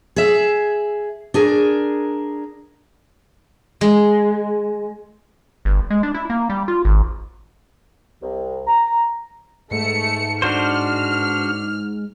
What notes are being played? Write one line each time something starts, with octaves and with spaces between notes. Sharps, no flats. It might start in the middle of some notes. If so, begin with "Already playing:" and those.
G#4 E5
D4 G#4 A#4
G#3
G1
G#3
D4
E4
A#3
G3
F4
G#1
C2
A#5
G#2 A3 C#7
D4 F#4 C5 F6